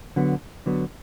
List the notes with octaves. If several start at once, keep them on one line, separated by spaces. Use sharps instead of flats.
D3 F#3 B3
D3 F#3 B3